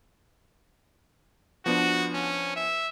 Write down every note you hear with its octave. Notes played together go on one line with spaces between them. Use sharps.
F3 B3 D4 F#4
C#4
E5